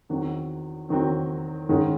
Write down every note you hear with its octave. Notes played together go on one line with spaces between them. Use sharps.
E2 D#3 F#3 C4 F#4
E2 D#3 F#3 C4 F#4
G#2 D#3 G#3 C#4